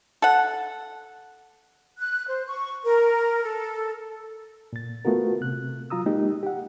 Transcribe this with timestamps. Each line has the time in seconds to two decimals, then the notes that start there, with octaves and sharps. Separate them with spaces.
0.22 A4 F#5
1.99 F#6
2.28 C5
2.47 C#6
2.84 A#4
3.43 A4
4.73 A#2 A6
5.05 A3 B3 F4 F#4 A#4
5.41 C3 F#6
5.90 F#3 F4 A#5 D#6 E6
6.06 G#3 A#3 D#4 G4
6.43 G4 F#5